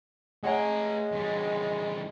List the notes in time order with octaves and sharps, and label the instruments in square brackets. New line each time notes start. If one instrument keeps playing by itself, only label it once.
[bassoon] G#3 [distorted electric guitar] A3 A#5 [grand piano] C#5 F#5 G#5
[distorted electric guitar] E2 G3